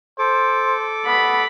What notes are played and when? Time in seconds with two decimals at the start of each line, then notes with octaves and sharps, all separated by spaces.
0.19 A4 C5 D6
1.06 B3 B5